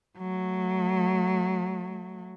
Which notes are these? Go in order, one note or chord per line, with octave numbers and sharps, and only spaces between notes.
F#3 A3